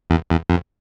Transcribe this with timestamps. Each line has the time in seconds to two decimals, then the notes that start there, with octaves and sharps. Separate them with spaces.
0.10 E2
0.30 E2
0.50 F2